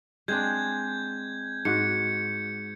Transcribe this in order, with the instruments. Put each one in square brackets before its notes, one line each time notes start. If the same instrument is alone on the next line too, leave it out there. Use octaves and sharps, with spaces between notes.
[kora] G#3 C4 D4 [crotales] G6 G#6
[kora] G#2 F#4 [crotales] C#7